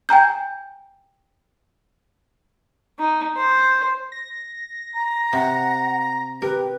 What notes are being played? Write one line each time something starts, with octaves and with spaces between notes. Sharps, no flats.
G5 G#5 A#5 G6
D#4
C5
A#6
A#5
C3 F#5
G4 A#4 B4